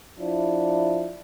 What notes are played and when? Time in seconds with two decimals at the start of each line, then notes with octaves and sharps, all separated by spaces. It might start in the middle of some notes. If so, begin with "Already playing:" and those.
0.19 F3 D4 E4